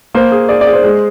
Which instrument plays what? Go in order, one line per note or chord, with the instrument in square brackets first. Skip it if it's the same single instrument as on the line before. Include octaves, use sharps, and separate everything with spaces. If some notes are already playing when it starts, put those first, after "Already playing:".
[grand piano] A#3 [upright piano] C5
[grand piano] G#4
[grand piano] G#4 [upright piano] D5
[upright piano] D5
[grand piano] G#4
[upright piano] C5
[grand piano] G#3